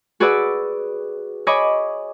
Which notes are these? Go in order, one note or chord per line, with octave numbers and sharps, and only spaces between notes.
F#4 G#4 B4 D5 F#5 E6
C#5 D#5 G#5 B5 D6